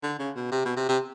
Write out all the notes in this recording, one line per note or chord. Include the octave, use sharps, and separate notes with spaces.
D3
C#3
B2
C3
B2
C3
C3